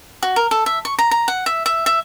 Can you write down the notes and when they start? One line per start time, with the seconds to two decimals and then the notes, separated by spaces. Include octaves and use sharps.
0.23 F#4
0.36 A#4
0.51 A4
0.66 E5
0.85 C#6
0.99 A#5
1.11 A#5
1.28 F#5
1.46 E5
1.66 E5
1.86 E5